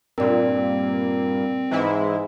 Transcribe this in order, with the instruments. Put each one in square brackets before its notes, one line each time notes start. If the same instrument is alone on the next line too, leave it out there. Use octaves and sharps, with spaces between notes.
[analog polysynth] G2 A#2 [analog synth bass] C4 [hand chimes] A#4 D5
[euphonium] G#2 [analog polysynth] E3 G#3 E4